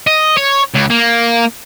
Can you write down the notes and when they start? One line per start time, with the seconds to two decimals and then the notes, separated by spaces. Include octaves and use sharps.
0.07 D#5
0.38 C#5
0.75 C#2
0.91 A#3